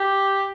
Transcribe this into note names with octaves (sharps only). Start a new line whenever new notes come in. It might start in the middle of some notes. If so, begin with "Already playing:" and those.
Already playing: G4